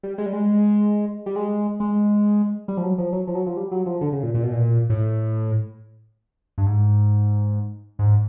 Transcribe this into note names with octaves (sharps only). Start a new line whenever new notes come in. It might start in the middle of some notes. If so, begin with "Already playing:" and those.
G3
G#3
G3
G#3
G3
G#3
G#3
G3
F3
F#3
F3
F#3
F3
F#3
F3
G3
F#3
F3
D3
C#3
A#2
A#2
B2
A#2
A2
G2
G#2
G#2